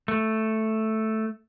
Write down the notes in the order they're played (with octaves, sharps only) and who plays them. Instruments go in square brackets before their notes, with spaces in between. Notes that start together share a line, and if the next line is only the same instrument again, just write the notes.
[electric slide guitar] A3